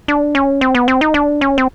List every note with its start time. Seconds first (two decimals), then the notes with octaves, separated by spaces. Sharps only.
0.08 D4
0.35 C#4
0.61 C4
0.75 B3
0.88 C4
1.01 D#4
1.14 D4
1.41 C#4
1.58 C4